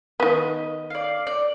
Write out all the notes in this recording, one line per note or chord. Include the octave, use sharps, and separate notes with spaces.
D#3 B3 D#5
D5 F5
D5